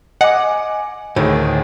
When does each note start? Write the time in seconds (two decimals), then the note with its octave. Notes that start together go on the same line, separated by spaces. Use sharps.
0.21 D#5 F#5 G#5 D6
1.16 D2 A2 D#3 G#4